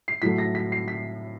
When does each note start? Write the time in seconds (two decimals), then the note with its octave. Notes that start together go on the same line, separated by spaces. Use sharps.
0.08 C7
0.22 A2 F#3 A3 B6
0.38 A#6
0.55 B6
0.72 C7
0.88 B6